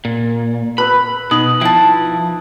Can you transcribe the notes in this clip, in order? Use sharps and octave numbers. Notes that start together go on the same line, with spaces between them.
A#2
B4 B5 E6
B2 D#4 D#6 F#7
F3 E4 G5 A5